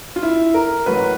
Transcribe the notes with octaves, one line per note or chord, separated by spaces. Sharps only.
F4
E4
A#4
A1 A2 F#3 A#3 B4